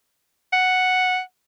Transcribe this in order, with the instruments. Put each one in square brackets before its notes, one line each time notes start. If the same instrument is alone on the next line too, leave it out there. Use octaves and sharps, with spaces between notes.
[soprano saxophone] F#5